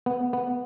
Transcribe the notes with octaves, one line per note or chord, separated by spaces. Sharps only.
B3
B3